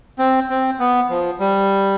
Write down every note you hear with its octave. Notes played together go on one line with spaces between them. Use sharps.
C4
C4
B3
F3
G3